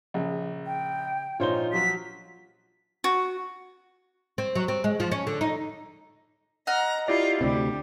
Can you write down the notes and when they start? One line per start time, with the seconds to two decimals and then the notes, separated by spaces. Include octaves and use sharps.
0.14 A#1 C#3
0.66 G5
1.40 A#1 D#4 F4 C5 C#5 G7
1.73 F3 F#3 B6
3.04 F#4
4.38 C4
4.55 F#3
4.68 C4
4.84 G#3
5.00 F3
5.12 C#4
5.27 D3
5.41 D#4
6.67 D#5 F#5 A#5 F6
7.08 E4 F4 G4 D5
7.41 D2 C3 G3